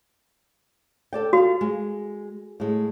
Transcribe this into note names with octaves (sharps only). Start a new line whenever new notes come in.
A4 D5 G5
F4 F#4 F5
G#3
A2 G#3